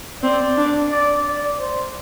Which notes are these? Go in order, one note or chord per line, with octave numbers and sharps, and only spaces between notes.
C4 D5
D4
D5
D5
C5